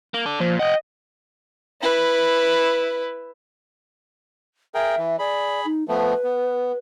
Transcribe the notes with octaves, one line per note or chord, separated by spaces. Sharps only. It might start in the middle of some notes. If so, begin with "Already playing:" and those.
A#3
A4 D5
A#2 F3
D#5 F#5 G5
E4 B4
G#4 A#4 E5 G5
E3
G#4 D5 B5
D#4
F3 A3 B3 B4
B3